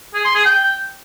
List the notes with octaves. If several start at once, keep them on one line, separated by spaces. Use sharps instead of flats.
G#4
C6
G#4
G5